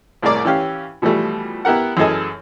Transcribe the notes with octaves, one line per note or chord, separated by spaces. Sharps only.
C2 A2 G#4 A#4 D5 D6
E3 C#4 G4 F5
B2 E3 F3 G3 A3
B3 E4 G4 A#4 F#5
F#2 E3 G#4 A4 D#5 G#5